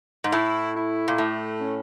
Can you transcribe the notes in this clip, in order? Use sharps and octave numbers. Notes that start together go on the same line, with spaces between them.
G#2
A2 E4
E4
A#2
A2 A3
C#4